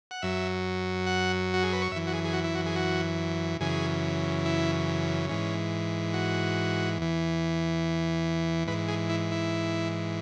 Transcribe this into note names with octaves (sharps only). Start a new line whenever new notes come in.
F#5
F#2 F#3 E5
F#5
F#4
G#4
B4
C#5
F#2 E3 E5
F#4
G#4
G#4
F#4
E4
F#4
G#4
F#4
F#2 C#3 E3 G#4
E4
G#2 E3 C#4
F#4
E2 E3
G#2 E3 B4
G#4
E4
E4